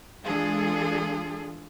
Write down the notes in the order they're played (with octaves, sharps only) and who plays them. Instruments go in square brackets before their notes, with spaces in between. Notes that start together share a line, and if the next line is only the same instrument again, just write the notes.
[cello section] E3 G#3 D4 F4 G#4 A4